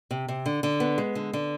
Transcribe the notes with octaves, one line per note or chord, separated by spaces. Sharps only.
C3
C3
D3
D3
B3
G#3
D3
D3